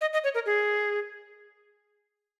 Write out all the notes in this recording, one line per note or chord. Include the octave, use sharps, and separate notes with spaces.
D#5
D#5
C#5
A#4
G#4